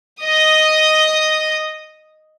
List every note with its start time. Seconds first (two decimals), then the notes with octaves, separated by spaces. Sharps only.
0.22 D#5 D#6